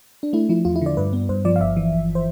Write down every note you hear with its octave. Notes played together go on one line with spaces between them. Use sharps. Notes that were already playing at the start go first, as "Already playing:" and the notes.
D4
A3 E4
F3 E4
E2 F4
E4
D3 D5
G2 B4
B3
G2 C5
F3 D5
F5
G1 E5
E3
G1
C5